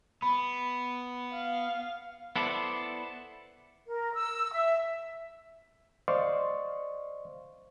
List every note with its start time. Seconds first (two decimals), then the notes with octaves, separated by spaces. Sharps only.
0.22 B3 B5
1.32 F5
2.36 B3 E4 A4 C5 D5
3.87 A#4
4.14 E6
4.53 E5
6.08 C5 D5 D#5 F5 C6 C#6